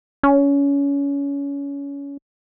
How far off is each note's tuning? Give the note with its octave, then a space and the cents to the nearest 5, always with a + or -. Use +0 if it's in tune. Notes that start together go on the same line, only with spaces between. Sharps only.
C#4 +25